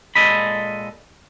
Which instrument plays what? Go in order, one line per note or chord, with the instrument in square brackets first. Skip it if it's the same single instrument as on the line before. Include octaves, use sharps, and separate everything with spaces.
[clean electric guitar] A#2 G#3 A4 D#5 B5